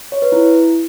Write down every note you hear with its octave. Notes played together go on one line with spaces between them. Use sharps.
C#5
B4
E4